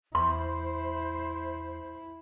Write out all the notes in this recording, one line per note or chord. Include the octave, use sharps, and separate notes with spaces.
E2 E4 C5 C6